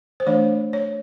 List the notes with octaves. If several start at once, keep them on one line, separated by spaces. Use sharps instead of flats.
C5
E3 A3 D4 C#5
C#5